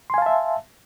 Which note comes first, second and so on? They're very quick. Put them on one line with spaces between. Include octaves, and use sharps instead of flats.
C6 G#5 F5 A5 E5